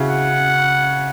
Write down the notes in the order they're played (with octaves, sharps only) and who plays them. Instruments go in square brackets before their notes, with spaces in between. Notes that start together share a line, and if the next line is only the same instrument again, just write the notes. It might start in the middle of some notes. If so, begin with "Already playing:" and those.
Already playing: [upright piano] C#3 E4 F#4
[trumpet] F#5